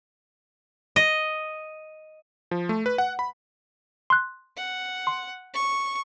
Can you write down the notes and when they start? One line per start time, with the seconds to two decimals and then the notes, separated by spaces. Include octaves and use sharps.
0.96 D#5
2.51 F3
2.69 A3
2.86 B4
2.98 F#5
3.19 B5
4.10 C6 F#6
4.56 F#5
5.07 C6
5.54 C#6